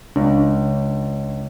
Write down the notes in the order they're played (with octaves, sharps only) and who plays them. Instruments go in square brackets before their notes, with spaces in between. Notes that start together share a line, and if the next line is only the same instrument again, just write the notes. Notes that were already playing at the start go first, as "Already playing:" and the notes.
[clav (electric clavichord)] C#2 [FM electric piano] D4